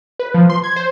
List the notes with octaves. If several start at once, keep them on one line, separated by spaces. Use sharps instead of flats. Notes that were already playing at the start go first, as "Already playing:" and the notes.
B4
F3
C6
G#6
C5